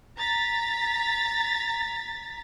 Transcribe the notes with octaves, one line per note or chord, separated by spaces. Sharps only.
A#5 A6 B6